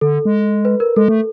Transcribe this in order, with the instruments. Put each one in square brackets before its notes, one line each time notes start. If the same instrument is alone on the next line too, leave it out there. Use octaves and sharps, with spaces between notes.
[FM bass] D3 [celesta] A4
[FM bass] G#3
[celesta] B4
A#4
[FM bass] G#3 [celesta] A4
[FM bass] A3